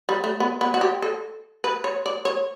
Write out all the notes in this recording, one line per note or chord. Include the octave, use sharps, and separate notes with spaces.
G3
A3
B3
B3
F#4
G4
A4
B4
C#5
D5
C#5